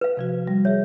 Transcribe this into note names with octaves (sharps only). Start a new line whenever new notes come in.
B4 F5
C3 F3 F#4
G3
G#4 C#5 E5